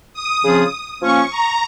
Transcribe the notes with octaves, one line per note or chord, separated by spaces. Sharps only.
D#6
C#3 F3 C4 F4 G#4
F3 A#3 C#4 C#6
A#5